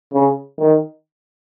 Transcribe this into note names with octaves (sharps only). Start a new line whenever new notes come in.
C#3
D#3